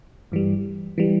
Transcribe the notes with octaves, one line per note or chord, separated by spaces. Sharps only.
G2 E3 G3
E3 G3